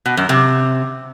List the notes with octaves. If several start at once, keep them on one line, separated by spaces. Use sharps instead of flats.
B2
F#2
C3